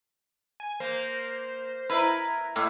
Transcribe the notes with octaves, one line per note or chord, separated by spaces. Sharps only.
G#5
A#3 C5
E4 A#4 B4 A#5
A2 A#3 E4